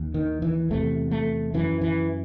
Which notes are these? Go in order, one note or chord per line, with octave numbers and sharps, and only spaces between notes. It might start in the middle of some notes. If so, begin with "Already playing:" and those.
Already playing: D#2
D#3
E3
E2 C3 A3
A3
F#2 E3
E3